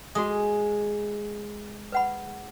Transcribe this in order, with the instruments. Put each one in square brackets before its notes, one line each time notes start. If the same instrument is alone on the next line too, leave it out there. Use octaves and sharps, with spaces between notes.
[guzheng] G#3 [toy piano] F#4 G#4 D#6
[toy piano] B4 F#5 B5